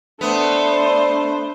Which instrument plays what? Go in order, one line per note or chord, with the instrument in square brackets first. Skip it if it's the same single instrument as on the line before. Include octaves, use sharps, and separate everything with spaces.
[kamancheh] A3 C5 [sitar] B3 [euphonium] D4